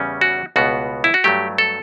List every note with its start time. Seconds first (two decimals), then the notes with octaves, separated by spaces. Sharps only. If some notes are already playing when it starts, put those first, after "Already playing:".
Already playing: E2 C#3 G3 C#4
0.21 F#4
0.56 C#2 B2 G3 B3 F#4
1.04 E4
1.14 F#4
1.24 G2 F#3 A3 G4
1.58 A4